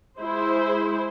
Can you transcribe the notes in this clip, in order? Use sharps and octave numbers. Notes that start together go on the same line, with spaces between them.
G#3 E4 C5